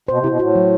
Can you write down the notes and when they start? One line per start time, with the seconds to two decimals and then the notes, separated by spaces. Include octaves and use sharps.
0.08 B2 C5
0.18 C3
0.24 B2 E4
0.39 A2 F#4
0.56 F#3